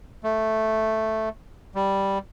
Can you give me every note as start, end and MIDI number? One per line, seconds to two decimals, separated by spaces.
0.24 1.29 57
1.75 2.18 55